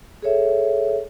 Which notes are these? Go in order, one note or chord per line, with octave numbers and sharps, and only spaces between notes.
G#4 A4 C#5 E5